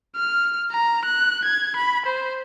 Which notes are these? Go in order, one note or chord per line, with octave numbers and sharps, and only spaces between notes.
F6
A#5
F#6
G#6
B5
C5